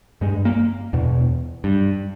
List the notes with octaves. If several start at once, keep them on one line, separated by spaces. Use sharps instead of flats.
G2 G#3
A#3
E2 B2
G2